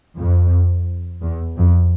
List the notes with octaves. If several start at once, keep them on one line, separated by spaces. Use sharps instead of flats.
F2
E2
F2